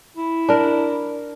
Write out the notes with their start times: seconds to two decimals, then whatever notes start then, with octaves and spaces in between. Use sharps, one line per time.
0.17 E4
0.49 D4 A#4